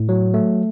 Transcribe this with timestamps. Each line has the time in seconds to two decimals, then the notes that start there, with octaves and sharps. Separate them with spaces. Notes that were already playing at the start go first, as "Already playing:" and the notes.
Already playing: A2
0.09 F#3
0.34 A3